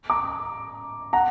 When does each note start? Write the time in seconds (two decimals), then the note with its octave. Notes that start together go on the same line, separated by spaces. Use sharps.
0.10 A#5 D6
1.13 F#5 A#5